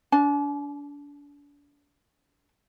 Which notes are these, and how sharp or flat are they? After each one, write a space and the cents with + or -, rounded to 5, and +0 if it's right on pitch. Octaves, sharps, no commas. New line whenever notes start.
D4 -35 G#5 +45